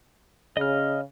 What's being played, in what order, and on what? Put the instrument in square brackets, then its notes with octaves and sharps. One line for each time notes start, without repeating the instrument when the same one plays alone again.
[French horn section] C#3 [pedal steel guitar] D#5 F6